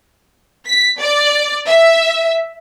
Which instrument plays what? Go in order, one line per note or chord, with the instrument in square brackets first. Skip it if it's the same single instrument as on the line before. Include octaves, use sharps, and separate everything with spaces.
[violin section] B6
D5
E5